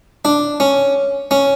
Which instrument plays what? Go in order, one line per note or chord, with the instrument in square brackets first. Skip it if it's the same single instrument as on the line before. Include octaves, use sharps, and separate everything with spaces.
[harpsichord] D4
C#4
C#4